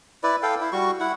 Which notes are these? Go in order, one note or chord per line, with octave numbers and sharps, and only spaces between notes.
E4 B4 D5
A4 F5 G5
E4
G3 F#4 C#6
E4 F#5